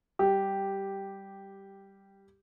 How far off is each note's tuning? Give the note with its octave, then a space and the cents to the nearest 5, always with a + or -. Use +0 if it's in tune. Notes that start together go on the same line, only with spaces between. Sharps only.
G3 +0 G4 -5